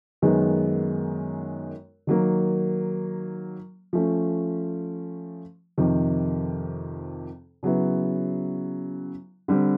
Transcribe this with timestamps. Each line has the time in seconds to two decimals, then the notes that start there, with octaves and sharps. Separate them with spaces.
0.22 F#2 D#3 G#3 B3
2.07 D#3 F#3 A#3
3.93 F3 A3 C#4
5.78 F2 C3 D#3
7.63 C#3 F#3 B3 E4
9.48 D3 G3 C4